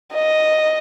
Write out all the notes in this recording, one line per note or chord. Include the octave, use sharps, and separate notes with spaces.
D#5